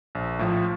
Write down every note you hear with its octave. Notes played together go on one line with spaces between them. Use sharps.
A#1
A2 F3